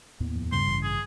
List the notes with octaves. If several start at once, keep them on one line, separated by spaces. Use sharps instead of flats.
D#2 A2 B3
F2
G2 C#3 C6
A1
G#4